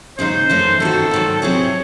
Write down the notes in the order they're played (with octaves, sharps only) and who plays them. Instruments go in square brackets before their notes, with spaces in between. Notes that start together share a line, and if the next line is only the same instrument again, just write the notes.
[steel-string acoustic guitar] D#2 C#3 G#3 D#4 [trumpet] C5
[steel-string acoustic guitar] F#2 E3 A3 D#4
[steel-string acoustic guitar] D#3 A3 C4 F#4 [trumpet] A4
[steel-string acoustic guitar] G#2 D#3 F#3
[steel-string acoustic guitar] C3 F#3 C4 E4 G#4 [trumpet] C#5